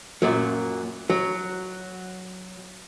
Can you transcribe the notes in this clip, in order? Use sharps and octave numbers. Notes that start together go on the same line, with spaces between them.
F#2 A#2 F#3
F#3